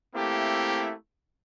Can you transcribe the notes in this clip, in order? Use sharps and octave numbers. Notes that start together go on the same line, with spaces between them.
A3 A#3 C4 E4 G4